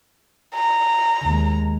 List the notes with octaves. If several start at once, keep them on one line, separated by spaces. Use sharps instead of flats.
A#5
D#2 G#3